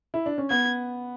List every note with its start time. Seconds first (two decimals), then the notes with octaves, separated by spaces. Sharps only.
0.14 E4
0.26 D4
0.38 C#4
0.50 B3 G#6